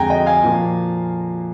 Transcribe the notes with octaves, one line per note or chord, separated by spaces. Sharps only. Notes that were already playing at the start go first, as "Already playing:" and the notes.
Already playing: F2 D3 G#3 G5 G#5 A#5
D#5 G5
F5 G#5
A#2 F3 A#3